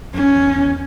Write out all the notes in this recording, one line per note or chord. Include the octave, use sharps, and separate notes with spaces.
F#2 C#4
E2
E2